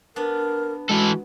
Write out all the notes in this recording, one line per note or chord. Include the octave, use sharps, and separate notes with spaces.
B3 D4 A#4
E3 G#3 F#4 A4